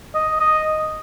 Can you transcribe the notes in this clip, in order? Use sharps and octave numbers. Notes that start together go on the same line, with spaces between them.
D#5
D#5